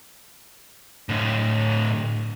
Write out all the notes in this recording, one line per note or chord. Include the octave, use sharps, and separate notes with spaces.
A2 D3